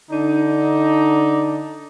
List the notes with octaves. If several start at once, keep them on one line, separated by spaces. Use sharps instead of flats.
D3 D4 D#4